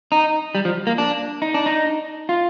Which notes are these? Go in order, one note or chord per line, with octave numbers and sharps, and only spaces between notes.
D#4
G3
F3
A#3
D4
D#4
D4
D#4
F4